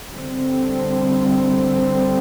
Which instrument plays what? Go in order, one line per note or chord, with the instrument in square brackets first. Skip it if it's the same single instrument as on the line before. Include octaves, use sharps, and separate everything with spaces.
[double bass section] D3 G3 C4